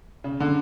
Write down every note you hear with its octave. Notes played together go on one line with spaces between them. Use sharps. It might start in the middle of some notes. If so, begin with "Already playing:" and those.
C#3
D3